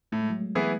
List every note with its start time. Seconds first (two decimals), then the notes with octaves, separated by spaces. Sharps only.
0.12 A2 A3
0.21 G#3
0.30 F#3 A3
0.55 E3 B3 E4 G#4